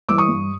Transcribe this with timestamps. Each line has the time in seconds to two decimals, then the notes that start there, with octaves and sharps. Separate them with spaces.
0.09 E3 G3 D6 E6
0.18 C#6 D#6
0.29 G2